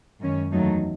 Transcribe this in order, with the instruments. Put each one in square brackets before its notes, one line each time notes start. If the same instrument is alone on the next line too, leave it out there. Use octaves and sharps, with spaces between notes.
[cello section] F#2 D#3 G#3 C#4
E2 D#3 F#3 A3 D#4